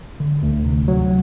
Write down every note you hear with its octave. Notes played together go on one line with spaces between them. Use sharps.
D3
D2
C3
F#3